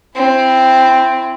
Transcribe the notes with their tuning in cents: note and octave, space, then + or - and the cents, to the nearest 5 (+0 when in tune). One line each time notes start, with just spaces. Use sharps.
C4 +0 E4 +30